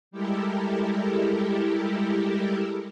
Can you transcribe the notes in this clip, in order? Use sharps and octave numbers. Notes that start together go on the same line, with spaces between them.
G3 G#3 E4 G4 A4 A#4